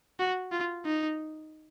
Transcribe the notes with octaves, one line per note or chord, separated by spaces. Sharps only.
F#4
F4
D#4